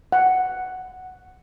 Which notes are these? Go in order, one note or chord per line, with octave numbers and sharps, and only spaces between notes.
F#5